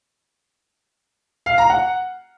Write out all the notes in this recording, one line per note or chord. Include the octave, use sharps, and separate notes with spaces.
F5
A#5
F#5